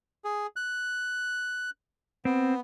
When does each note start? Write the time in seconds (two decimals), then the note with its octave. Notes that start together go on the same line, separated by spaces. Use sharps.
0.25 G#4
0.56 F#6
2.25 B3 C4